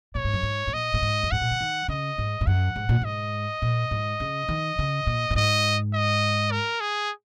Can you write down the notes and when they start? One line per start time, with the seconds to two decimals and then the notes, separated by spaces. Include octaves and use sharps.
0.15 A#2 C#5
0.24 G#2
0.33 F#2
0.43 G#2
0.67 G#2
0.73 A#2 D#5
0.94 A#2
1.02 G#2
1.23 F#2
1.31 G#2 F#5
1.41 A#2
1.51 C#3
1.61 D#3
1.88 C#3 D#5
2.18 G#2
2.41 G#2
2.47 F#2 F#5
2.76 G#2
2.89 A#2
3.02 G#2 D#5
3.62 A#2
3.91 G#2
4.20 C#3
4.49 D#3
4.79 C#3
5.07 A#2
5.31 A#2
5.35 G#2 D#5
5.94 D#5
6.51 A#4
6.80 G#4